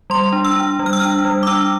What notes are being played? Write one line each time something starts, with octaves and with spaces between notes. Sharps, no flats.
G3 C6
D4
E6
D4
G3
F6
E6
D4 F6
G3
D6
D4 E6